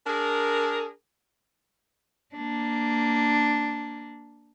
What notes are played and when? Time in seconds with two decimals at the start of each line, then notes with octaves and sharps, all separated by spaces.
0.06 D4 G#4 A#4
2.35 A#3 D4